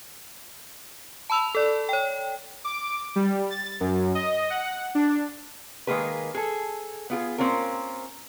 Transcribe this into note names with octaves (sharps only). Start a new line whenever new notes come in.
A5 B5 E6 F7
A4 D5
C#5 G5
D6
G3
A6
F#2
D#5
F#5
D4
D#3 G#3 A#3 G#4 B4
G#4 A4
B3 F4 G4 G#4
A#3 C4 C#4 F4 A#4